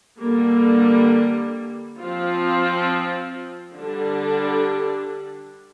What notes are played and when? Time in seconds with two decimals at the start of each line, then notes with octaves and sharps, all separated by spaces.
0.19 D3 G3 A#3
1.97 F3 C4 F4
3.75 D3 G3 D4